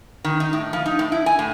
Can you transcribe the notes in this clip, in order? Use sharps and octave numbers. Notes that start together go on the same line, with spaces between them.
D#3
D#4
A2
F3
D#4
A2
E4
G#5
A2